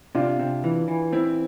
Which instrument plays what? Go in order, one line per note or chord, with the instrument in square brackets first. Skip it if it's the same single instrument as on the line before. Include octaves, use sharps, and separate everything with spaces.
[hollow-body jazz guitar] C3 [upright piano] D4 F4
[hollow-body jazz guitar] C3
E3
E3
[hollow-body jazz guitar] C4 [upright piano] E4